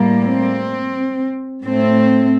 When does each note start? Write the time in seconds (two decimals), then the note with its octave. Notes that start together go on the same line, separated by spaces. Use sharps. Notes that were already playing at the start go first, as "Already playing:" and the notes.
Already playing: A2 G3 A#3
0.25 C4
1.63 A2 A3 C4